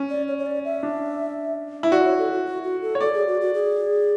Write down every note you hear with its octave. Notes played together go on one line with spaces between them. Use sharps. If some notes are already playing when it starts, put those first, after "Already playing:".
Already playing: C#4
D5
C#5
C#5
D5
E5
D4
E4
F#4 D5
C#5
A4
F#4
F#4
F#4
A4
C#5
A4 D5
G#4
F#4
F#4
G#4